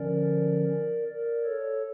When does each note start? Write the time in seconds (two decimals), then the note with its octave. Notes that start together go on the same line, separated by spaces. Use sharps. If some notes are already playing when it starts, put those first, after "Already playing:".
Already playing: D3 F3 C#4 A#4 D5
1.08 A#4 D5
1.44 A4 C#5